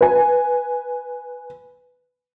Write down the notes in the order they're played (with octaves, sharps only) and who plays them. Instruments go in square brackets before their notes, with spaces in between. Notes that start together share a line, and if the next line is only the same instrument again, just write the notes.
[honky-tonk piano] B4 G#5